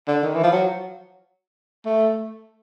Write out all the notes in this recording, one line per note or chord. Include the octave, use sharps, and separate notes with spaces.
D3
D#3
E3
F3
F#3
A3